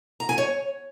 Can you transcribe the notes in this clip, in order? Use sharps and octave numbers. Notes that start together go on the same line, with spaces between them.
A#5
G#5
C#5